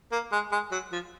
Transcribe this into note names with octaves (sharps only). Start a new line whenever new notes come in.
A#3
G#3
G#3
F#3
F3